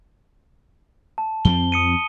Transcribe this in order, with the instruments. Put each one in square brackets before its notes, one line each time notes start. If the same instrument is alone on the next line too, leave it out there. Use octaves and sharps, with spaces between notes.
[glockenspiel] A5
[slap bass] F2 F3 C4 [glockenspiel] G7
[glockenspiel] D#6 C#7 D#7